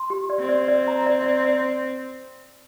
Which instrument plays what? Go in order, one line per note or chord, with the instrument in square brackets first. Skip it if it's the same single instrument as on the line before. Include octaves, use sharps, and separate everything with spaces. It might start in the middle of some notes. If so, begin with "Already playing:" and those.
Already playing: [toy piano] C6
G4
D5
[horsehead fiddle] C4
[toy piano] D5
D5
A#5
D5
D5
D5